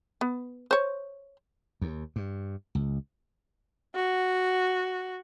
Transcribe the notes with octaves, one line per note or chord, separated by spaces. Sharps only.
B3
C5 C#5
D#2
G2
C#2
F#4